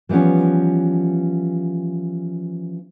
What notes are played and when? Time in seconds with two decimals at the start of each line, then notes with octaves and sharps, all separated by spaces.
0.09 E3 F3 G3 B3 C#4